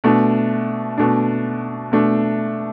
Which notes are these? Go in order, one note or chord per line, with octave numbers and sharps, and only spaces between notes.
B2 A3 D4
B2 A3 D4
B2 A3 D4